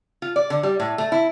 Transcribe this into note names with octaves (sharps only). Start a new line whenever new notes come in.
F4
D5
D3
G3
A2
A3
E4